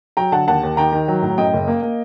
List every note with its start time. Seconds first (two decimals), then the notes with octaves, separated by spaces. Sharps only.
0.17 F#3 G5 A#5
0.32 D3 F#5 A5
0.48 D#2 F#5 A5
0.63 D#2
0.77 D#3 G5 A#5
0.92 D#3
1.08 F#3
1.22 A2
1.38 F#2 D#5 G5
1.53 F#1
1.68 A#3
1.83 A#3